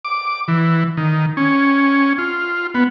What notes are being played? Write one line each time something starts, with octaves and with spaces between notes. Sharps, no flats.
D6
E3
D#3
C#4
F4
B3